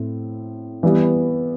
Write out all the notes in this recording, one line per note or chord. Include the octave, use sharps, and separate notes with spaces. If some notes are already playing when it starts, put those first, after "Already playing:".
Already playing: A2 C4
E3 G3 B3